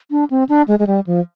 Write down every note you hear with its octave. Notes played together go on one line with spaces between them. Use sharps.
D4
C4
D4
G#3
G#3
G3
F3